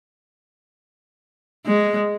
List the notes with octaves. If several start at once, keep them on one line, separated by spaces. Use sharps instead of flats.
G#3